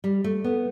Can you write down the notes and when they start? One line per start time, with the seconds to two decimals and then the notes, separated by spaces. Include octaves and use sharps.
0.04 G3
0.24 A3
0.44 B3